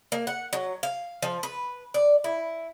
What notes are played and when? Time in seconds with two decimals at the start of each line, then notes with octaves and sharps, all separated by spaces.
0.12 A#3
0.27 F#5
0.53 F#3
0.83 F5
1.22 F3
1.43 B4
1.94 D5
2.24 E4